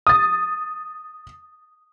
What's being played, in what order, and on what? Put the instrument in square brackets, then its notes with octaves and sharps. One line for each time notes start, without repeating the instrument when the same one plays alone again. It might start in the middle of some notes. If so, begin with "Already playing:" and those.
[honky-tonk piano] D#6 A6